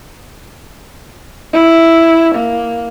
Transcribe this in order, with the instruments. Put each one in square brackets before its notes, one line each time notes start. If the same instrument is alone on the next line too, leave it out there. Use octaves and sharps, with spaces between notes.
[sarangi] E4
A#3